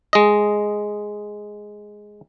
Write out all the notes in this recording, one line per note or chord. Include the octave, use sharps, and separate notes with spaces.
G#3 D#5